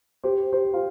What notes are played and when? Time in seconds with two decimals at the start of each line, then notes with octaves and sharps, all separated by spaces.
0.23 G4 C5
0.52 G4 C5
0.74 F4